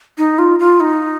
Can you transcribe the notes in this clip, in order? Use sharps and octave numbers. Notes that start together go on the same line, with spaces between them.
D#4
F4
F4
D#4